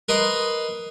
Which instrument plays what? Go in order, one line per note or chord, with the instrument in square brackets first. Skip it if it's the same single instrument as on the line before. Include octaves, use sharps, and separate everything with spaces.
[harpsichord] A#4 B4 D#5 C6